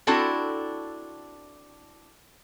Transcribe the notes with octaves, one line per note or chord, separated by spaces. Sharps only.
C4 D4 E4 F#4 A4 A5